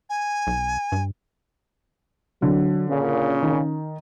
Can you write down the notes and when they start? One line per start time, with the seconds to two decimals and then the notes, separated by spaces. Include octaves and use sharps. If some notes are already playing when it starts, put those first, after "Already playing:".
0.10 G#5
0.47 B1
0.92 G2
2.42 D3 F#3
2.89 A#2 C#3 C#4
3.42 D#3